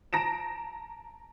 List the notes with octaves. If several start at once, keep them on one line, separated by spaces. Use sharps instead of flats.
A5 A#5 A#6 D7 E7